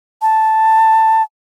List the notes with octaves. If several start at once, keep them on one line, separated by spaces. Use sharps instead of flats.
A5